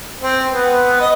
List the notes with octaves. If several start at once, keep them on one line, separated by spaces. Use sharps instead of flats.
C4
B3
D#5